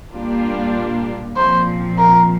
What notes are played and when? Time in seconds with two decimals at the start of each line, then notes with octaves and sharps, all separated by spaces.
0.14 A#2 G3 A#3 D4 F4
1.36 A#2 F3 C4 C5
1.98 A#4